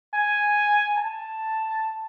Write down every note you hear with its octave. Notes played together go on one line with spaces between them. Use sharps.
G#5
A5